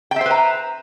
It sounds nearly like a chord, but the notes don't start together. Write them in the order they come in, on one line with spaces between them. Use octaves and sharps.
G5 E5 C5 B4 A#5